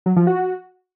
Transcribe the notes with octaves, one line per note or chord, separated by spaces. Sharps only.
F#3
F3
F#4